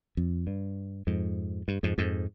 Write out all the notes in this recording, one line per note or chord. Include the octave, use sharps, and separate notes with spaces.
F2
G2
F2 G#2
G2
F2 G#2
F2 G#2